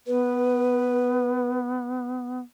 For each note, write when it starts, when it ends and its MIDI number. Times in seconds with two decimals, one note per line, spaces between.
0.07 2.39 59
0.07 1.60 71